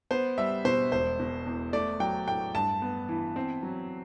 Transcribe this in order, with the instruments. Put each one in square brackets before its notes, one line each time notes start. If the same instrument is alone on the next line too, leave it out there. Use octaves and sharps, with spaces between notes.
[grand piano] B3 C5
G3 E5
B2 C5
E1 C5
B2
E2
A3 D5
F#3 G5
A2 G5
G2 A5
B3
E3
C4
F#3